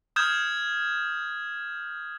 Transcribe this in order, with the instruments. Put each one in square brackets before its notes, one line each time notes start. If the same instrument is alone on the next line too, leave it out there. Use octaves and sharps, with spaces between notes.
[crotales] D#6 F6 G6 G#6 E7